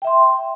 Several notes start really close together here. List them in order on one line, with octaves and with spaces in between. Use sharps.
G5 E5 C6